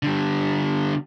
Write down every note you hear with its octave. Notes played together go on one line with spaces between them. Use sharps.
D3 G3